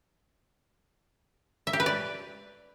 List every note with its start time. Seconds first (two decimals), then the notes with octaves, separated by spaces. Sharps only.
1.67 E5
1.73 G4
1.80 B4
1.86 D5